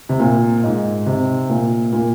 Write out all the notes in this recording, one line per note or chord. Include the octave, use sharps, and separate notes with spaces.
C3
A#2
G#2
C3
A#2
A#2